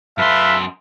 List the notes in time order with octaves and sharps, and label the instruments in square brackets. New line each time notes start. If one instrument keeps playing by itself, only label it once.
[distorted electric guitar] F#2 C6 [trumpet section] A3 B4 F5 [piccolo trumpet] E5